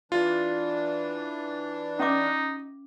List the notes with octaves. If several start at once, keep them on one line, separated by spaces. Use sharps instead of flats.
E3 D4 F4
C#4 D#4 E5 D6